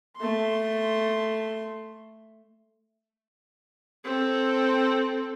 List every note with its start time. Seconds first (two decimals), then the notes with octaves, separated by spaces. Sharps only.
0.17 A3 C6
4.04 C4 A4